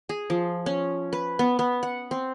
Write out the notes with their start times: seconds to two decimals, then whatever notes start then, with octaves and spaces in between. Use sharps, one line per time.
0.09 G#4
0.30 F3
0.66 C#4
1.13 B4
1.39 B3
1.59 B3
1.83 F#5
2.11 C4